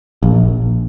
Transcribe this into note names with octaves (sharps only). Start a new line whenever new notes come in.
A#1